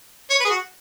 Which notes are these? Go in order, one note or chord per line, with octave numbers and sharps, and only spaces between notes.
C#5
B4
G#4
F#4